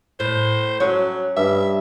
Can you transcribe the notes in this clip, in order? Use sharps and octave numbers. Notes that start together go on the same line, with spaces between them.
A2 C5
F#3 C#4
G2 E5